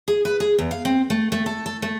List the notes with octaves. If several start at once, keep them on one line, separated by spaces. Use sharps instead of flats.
G#4
B4
G#4
E2
F5
C4
A3
A3
A4
A4
A3